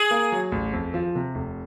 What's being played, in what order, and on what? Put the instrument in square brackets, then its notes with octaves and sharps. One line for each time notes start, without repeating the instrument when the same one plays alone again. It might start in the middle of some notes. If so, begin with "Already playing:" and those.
Already playing: [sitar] G#4
[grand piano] A#3
F#3
A1
F2
F3
C3
F1